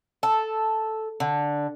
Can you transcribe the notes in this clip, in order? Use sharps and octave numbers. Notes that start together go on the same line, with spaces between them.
A4
D3